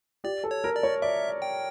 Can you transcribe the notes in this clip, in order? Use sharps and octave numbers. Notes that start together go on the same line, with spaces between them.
G4 D5
A4
C#5
A#4
D5
C#5
D5 E5
G5